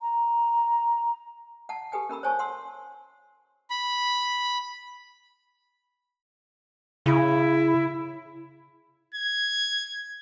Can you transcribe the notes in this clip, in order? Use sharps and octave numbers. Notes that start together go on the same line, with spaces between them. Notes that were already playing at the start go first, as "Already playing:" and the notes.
A#5
F#5 A5
G4 A4 B4 G5 G#5
C#4 A#4 B5 E6
C5 C#5 G#5 A5 C#6
F#5 C6 E6
B5
C#3 E4
G#6